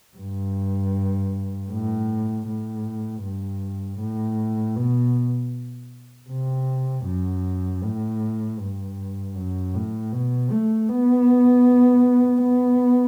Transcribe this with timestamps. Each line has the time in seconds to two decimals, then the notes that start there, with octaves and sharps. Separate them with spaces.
0.17 G2
1.70 A2
2.47 A2
3.23 G2
4.00 A2
4.76 B2
6.30 C3
7.06 F#2
7.83 A2
8.59 G2
9.35 F#2
9.74 A2
10.12 B2
10.50 A3
10.88 B3
12.42 B3